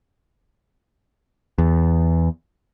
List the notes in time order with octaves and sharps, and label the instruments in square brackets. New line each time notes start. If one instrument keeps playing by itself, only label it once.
[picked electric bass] E2